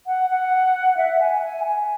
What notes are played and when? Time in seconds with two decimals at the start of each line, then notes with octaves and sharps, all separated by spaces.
0.07 F#5
0.30 F#5
0.97 E5
1.20 G#5
1.43 G#5
1.64 G#5